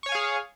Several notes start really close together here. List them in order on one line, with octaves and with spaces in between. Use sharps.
C#6 C#5 G#5 F5 G#4